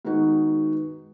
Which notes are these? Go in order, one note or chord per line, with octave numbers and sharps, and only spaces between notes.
D#3 G#3 B3 D#4 F#4 G#4